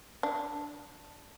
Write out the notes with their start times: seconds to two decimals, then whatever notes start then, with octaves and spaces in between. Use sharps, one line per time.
0.23 D4